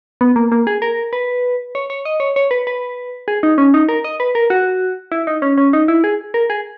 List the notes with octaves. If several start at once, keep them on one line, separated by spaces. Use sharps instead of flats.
B3
A#3
A#3
G#4
A#4
B4
C#5
C#5
D#5
C#5
C#5
B4
B4
G#4
D#4
C#4
D#4
A#4
D#5
B4
A#4
F#4
E4
D#4
C#4
C#4
D#4
E4
G#4
A#4
G#4